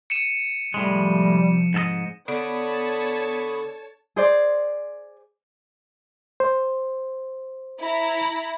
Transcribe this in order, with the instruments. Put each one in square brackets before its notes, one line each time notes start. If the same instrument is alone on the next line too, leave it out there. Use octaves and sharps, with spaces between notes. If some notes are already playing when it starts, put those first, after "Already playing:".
[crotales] C#7 D#7 E7
[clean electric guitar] A2 G#3 [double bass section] C3 F3 [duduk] G3
[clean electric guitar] G#2 A4 D#5
[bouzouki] D3 [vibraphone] B3 [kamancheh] C#5 A5 [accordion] B5 C#6 D#6
[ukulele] G#4 C5 D5
[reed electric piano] C5
[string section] E4 A#5